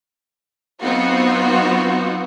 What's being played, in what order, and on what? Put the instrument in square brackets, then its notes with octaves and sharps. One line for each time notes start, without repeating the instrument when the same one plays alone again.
[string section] F#3 B3 C4 D#4 F4 F#4